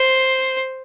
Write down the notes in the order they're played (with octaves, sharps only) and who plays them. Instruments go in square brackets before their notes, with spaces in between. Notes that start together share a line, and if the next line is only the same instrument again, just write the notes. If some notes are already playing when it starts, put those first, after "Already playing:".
Already playing: [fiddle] C5